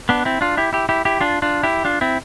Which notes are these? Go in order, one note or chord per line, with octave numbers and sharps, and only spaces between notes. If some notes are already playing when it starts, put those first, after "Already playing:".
B3 D4
C4 E4
D4 F4
E4 G4
E4 G4
E4 G4
E4 G4
D4 F4
D4 F4
E4 G4
D4 F4
C4 E4